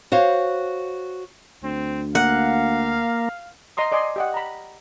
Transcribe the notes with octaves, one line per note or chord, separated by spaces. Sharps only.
F#4 C5 C#5 F5
D2 C4
A#3 F5 F#5
D#5 A#5 C6 D#6
D5 D#5 G#5 C6
G4 D#5 F#5
A#5 B5